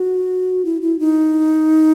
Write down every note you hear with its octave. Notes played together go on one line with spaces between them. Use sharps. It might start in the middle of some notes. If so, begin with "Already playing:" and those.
Already playing: F#4
E4
E4
D#4